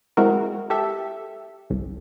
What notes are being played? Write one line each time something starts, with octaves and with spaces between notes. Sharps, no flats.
G#3 C4 E4 F#4 A#4
G4 A4 E5
G1 C2